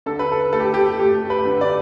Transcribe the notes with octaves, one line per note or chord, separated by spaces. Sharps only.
D3 A4
B4
A4
A3 A4
G4
G4
A3 G4
B4
D3
D5